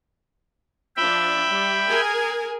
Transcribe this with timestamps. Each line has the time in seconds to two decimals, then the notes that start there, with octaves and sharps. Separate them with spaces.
0.97 F3 D4 E5 G5 B5
1.47 G3
1.87 G#4 A#4 G#5